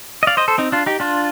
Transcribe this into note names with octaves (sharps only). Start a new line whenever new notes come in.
D#5
D5 F5
C5 D#5
A4 C5
C4 D#4
D4 F4
D#4 G4
D4 F4